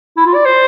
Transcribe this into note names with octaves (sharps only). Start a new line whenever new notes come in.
E4
F4
D5
C5